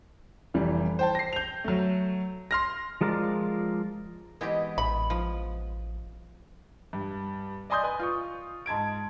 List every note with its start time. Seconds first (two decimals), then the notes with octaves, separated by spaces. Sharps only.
0.54 F1 E3 G3
0.99 C5 G5 A5
1.15 A#6 C7
1.33 G6 F7
1.64 F#3 A3
2.51 C6 F6 A#6
3.01 F3 G#3 F4 A#4 D5
4.41 E3 G#3 B3 C4 G4 D#5
4.78 A1 B5
5.10 F3
6.93 G2
7.70 D5 D#5 G#5 C6 D#6 G6
7.83 B4 G#5
8.00 F4 C#6
8.66 G#2 A5 G#6 D7